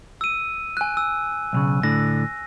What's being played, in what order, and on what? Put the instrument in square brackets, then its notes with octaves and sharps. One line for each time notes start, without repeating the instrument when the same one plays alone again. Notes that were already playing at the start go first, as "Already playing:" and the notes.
[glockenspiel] E6 D#7
G#5 F#6
E6
[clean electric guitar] B1 A2 C#3
[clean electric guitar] A2 D3 [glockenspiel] A#6